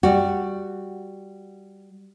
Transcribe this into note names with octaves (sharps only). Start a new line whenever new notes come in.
G3 F#4